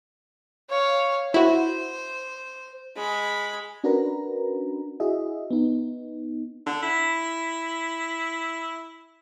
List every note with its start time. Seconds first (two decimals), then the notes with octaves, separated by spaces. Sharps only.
0.70 C#5 F5
1.34 E4 F#4 C5
2.96 G#3 B5
3.84 C#4 D4 F#4 A#4 B4 A#5
5.00 E4 F#4 G#4 D#5 E5
5.51 B3 D#4
6.66 D3
6.82 E4